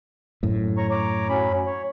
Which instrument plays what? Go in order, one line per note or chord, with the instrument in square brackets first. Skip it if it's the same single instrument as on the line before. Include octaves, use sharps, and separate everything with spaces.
[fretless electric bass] F#2 A2
[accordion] C#5 A#5 C#6
C#5 A#5 D6
F#3 C#4 B5
C#5